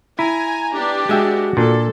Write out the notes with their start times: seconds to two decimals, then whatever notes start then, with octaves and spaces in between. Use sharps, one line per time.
0.19 E4 G#5 A#5
0.73 B3 D4 G4
1.09 G#3 F#4 E5 G5
1.57 A#2 D4 A4